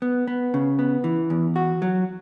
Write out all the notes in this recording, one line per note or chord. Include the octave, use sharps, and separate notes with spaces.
B3
B3
C#3
B3
E3
E2
F#4
F#3